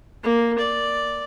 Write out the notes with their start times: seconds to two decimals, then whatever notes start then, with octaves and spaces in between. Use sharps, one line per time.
0.23 A#3
0.58 D5